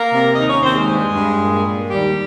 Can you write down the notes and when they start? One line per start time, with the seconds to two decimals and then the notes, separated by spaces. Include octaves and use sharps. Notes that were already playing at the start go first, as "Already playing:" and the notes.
Already playing: A#3 A#4
0.10 C3
0.35 D#2 D#4 D#5
0.48 C#4 C#5
0.61 D#2 C4 C5
0.74 G#3 G#4
0.87 G2
1.12 G2
1.38 A#2
1.64 A#2
1.89 D#2 G3 G4